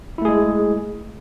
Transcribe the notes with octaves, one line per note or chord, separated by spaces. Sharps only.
G#3 A3 E4 G#4